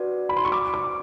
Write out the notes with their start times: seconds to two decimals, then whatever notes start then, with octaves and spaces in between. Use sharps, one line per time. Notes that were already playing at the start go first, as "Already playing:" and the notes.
Already playing: D4 F#4 B4 D5 F#5
0.29 B5
0.37 C6
0.45 C#6
0.52 D6
0.74 D6